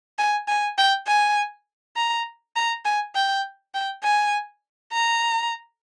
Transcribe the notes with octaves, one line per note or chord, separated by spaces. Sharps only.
G#5
G#5
G5
G#5
A#5
A#5
G#5
G5
G5
G#5
A#5